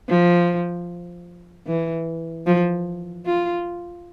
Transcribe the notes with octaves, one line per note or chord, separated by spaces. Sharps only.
F3
E3
F3
F4